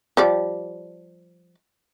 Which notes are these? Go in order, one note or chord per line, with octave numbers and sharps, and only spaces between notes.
F3 G3 D5